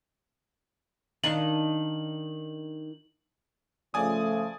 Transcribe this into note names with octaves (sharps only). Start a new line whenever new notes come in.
D#3 D4 D#4 F#7
C#3 F3 A3 D5 G#5 D#6